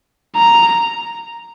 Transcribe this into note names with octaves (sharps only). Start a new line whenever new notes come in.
A#5